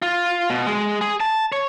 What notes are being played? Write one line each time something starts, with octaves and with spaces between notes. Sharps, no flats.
F4
B2
G#3
G#4
A5
C#5